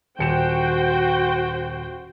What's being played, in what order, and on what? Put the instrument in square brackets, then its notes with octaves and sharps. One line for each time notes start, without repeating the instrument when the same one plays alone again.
[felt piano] D#1 C#7 E7 [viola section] F#4 C5 G5